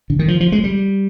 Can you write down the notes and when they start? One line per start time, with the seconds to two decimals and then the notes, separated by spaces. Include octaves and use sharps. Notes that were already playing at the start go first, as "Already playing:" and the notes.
0.10 D3
0.19 D#3
0.28 F3
0.40 F3
0.52 G#3
0.64 G3